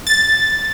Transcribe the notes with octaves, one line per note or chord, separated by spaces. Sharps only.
A6